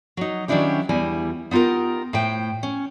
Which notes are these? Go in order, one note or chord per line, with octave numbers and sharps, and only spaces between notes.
F#3 D#4
D#3 F#3 C#4 D4 E4 G4
E2 G3 E4 G#5
B3 D#4 F4 G4 A#4
A2 C5 G5
C#4